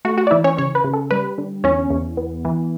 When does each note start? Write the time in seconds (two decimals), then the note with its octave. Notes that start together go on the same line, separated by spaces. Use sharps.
0.05 A3 F#4 F#5
0.17 F#4 F#5
0.27 D5
0.31 E3 E4 E5
0.44 C#4 C#5
0.57 C#3 C#4 C#5
0.75 B4
0.84 C#3
0.93 A4
1.11 G3 B4
1.38 D3
1.64 E2 C#4 C#5
1.90 E2
2.17 B3
2.45 E3